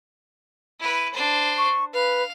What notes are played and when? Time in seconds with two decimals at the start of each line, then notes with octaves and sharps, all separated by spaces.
0.80 E4 B4
1.14 D4 C5
1.58 C#6
1.93 B4 F5